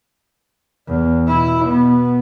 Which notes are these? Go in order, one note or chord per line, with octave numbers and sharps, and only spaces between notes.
E2
B2 E4
B2 B3